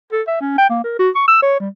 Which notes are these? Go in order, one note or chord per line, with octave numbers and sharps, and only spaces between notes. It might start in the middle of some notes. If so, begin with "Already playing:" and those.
A4
E5
C#4
G5
A#3
A#4
F#4
C#6
E6
C#5
G3